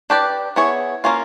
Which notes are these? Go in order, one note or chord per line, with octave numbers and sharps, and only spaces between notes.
D4 G4 B4 D5
B3 E4 G#4 C#5
A#3 C#4 F4